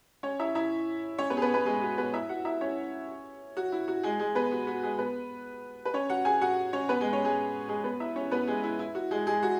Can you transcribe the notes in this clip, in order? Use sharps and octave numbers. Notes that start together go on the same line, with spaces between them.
C#4 C#5
E4 E5
E4 E5
C#4 C#5
B3 B4
G#4
B3 B4
B3 B4
G#3 G#4
F#4
B3 B4
E4 E5
F#4 F#5
E4 E5
C#4 C#5
F#4
E4
F#4
G#3 G#4
G#3 G#4
B3 B4
F#4
F#4
G#3 G#4
B3 B4
B4
C#4 C#5
F#4 F#5
G#4 G#5
F#4 F#5
C#4 C#5
B3 B4
G#3 G#4
C#4 C#5
G#3 G#4
G#3 G#4
B3 B4
E4 E5
C#4 C#5
B3 B4
G#3 G#4
E4
E4
F#4
G#3 G#4
G#3 G#4
F#4